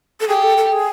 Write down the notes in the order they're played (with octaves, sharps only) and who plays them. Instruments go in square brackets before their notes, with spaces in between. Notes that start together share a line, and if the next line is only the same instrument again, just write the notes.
[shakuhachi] A4
[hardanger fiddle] G4 [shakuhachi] G#4
[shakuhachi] A4
A4
G#4